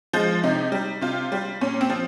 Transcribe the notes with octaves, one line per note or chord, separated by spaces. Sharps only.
F3 G#3
C3 D#4
G3
C3 F4
G3
A#2 C#4
C4
F3